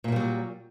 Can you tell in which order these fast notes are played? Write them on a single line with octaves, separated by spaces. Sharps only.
A#2 A#3 G3 F#3